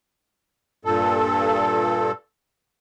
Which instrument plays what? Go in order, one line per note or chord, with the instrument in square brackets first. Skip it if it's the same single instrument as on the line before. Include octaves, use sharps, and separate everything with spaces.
[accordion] G2 A#2 A4